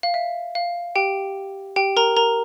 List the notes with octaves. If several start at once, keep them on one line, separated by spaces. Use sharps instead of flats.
F5
E5
F5
G4 G5
G4 G5
A#4 A#5
A#4 A#5